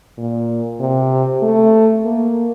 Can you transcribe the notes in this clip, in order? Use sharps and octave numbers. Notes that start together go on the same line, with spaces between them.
A#2
C3
A3
A#3